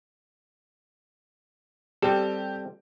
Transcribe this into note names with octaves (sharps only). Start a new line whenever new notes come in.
G3 C4 G4 A4